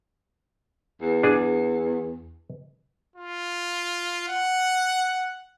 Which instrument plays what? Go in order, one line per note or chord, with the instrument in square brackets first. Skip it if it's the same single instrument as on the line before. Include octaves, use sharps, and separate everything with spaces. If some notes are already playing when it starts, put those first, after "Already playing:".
[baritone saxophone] E2
[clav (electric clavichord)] D4 G#4
[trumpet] F4
F#5